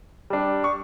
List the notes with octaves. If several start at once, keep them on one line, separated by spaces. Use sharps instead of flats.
G3 D4
C#6